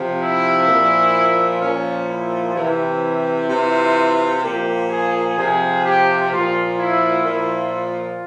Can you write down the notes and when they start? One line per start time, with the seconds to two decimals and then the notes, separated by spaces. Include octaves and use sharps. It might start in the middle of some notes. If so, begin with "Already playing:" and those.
Already playing: C3 F3
0.20 E4
0.67 A#2 F3
1.61 A#2 F3 C#4
2.07 E4
2.54 C3 E3
3.48 C3 E3 F4
4.42 A#2 F3 G4
4.90 G#4
5.37 C3 F3 G#4
5.84 G4
6.30 A#2 F3 F4
6.78 E4
7.24 A#2 F3 E4
7.72 F4